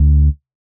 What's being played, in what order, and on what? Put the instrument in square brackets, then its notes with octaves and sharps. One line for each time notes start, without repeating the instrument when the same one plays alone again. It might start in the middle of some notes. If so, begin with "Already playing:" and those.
Already playing: [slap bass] D2